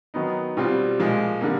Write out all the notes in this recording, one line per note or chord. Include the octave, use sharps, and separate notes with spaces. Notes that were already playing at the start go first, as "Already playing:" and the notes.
D#3 F#3 B3 D#4
B2 G3 C4 F4
A#2 F3 G#3
D3 G3 A#3